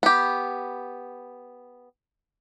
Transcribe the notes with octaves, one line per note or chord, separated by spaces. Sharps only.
B3 G4